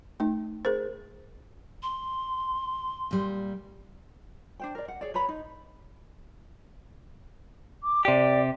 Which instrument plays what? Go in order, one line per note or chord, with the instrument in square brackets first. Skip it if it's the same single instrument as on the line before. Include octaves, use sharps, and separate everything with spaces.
[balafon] A3 D#4
G#4 A#4 C5
[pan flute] C6
[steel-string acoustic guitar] A#2 G3
[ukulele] D4 C5 G5
A#4 D5
F#5
G#4 C#5 D5
B4 C#5 A#5 B5
D#4
[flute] D6
[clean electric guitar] C3 G4 [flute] D5